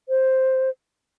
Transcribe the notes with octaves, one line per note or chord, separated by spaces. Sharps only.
C5